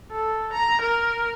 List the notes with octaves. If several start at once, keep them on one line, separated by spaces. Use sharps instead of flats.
A4
A#5
A#4